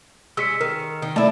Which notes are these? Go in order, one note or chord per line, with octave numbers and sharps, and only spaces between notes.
G#3 C#4 E6 B6 C#7
D#3 A#4
D#3
A3 D4 E4